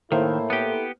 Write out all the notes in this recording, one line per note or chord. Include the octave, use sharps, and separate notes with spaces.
A2 D#3 A#3 E4 A4 C5
B3 G4